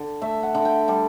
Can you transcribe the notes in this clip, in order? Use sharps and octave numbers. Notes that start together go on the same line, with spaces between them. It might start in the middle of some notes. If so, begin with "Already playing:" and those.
Already playing: D3
A3 E5
F#5
D3
G5
G3 A5